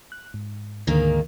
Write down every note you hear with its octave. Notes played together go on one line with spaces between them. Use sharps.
F#6
G#2
D2 G#2 D3 D#3 A#3